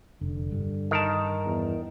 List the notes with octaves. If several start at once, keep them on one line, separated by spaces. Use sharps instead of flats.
F1 D3
G2
D#3 A#4 A5
E2